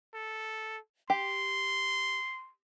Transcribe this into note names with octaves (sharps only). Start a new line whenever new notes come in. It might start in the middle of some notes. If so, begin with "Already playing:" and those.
A4
G4 C6